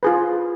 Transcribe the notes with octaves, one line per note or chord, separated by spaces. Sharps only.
F4 G#4 B4